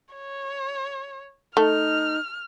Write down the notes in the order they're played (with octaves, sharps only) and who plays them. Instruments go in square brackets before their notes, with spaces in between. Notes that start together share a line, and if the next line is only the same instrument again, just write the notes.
[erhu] C#5
[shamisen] A3 [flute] D#4 [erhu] F6